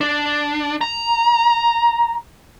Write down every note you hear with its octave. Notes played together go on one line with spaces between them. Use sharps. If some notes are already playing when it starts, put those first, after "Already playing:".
D4
A#5